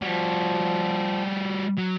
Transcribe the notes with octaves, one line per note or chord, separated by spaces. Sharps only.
F3 G3 F#4
F#3